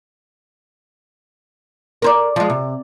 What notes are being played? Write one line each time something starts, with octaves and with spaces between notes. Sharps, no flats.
A#4 C5 D5
F3 G#3
C3